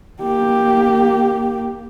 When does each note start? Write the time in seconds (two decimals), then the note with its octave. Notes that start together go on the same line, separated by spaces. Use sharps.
0.23 A#3 G4